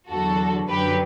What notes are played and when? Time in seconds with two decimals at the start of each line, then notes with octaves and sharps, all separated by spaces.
0.09 E2 D3 F#3 F#4 A4
0.68 F#2 D3 F#3 G4 B4